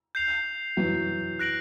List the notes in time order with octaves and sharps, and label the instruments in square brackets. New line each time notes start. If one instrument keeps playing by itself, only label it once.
[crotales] G6 C7 F7
[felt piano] E3 F#3
[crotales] F#6 A#6 D7 F#7